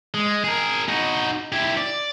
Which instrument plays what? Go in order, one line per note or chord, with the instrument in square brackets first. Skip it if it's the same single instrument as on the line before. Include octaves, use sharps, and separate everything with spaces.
[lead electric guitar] G#3
G#4 A#4
D#4 F#4
E4 G4
D5